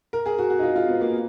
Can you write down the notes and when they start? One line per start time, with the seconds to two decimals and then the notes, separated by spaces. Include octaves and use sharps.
0.13 A#4
0.26 G#4
0.39 F#4
0.50 F#4
0.59 D#4
0.63 F4
0.76 F4
0.88 B3
1.01 A#3